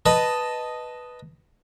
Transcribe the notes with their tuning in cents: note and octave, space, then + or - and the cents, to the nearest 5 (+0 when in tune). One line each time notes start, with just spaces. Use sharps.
B4 +0 D#5 +0 A5 +0